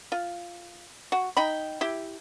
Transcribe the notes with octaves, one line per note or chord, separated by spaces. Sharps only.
F4
F#4
D#4 G5 B5
E4 G4